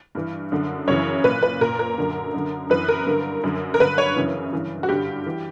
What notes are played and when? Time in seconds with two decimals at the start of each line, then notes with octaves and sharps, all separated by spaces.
0.15 G2 E3
0.52 F#2 D3
0.88 F#2 C#3 E3 C#5
1.24 A#2 B4
1.43 B4
1.61 A#2 A#4
1.79 A#4
1.98 F#2 D3
2.34 F#2 D3
2.70 F#2 E3 B4
2.88 A#4
3.06 G2 D3
3.44 F#2 D3
3.74 A#4
3.80 G2 D3 B4
3.98 C#5
4.16 F#2 C#3 E3
4.53 G2 E3
4.83 F#4
4.89 G2 D3 G4
5.26 E3